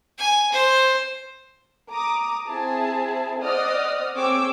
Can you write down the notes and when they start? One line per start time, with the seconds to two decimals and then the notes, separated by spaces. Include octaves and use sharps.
0.18 G#5
0.52 C5
1.91 A#5 D6 D#6
2.48 C4 E4 G#4 A5
3.39 C5 D5 D#5 F#5 D#6 F6
4.15 C4 G#4 C#5 G5 D6 E6